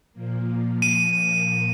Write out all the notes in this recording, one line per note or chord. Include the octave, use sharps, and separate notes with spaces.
A#2 F3 A#3
D#7